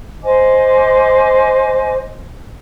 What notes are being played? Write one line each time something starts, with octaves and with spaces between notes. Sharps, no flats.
C5 D#5 G#5 D6